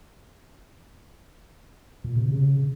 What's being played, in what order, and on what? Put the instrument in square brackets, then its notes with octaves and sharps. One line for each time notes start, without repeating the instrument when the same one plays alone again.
[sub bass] A#2
C3
C#3